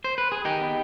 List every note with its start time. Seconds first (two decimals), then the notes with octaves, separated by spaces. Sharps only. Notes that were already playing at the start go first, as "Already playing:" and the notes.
0.04 C5
0.18 B4
0.32 G#4
0.45 D#3 D#4 G4
0.61 B3